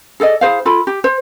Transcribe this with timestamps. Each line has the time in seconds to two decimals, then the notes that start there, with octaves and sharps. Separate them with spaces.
0.20 G#4 A4 D5 D#5
0.41 E4 G#4 C5 F5
0.65 F4 A4 B5
0.87 G4
1.04 C5